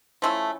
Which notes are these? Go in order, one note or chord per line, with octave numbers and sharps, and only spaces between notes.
F3 A3 C#4 E4